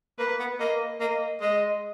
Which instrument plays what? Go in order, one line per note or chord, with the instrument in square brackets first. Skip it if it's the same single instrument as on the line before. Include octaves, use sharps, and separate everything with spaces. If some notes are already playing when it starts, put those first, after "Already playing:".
[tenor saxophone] A#3 [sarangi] B4
[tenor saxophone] B3
[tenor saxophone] A#3 [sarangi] D#5
[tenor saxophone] A#3 [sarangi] D#5
[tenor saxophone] G#3 [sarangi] D#5